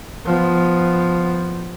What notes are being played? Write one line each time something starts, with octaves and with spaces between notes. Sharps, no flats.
F3 B3